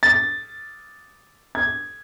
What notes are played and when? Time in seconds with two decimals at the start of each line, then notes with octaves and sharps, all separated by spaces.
0.03 A6
1.55 G#6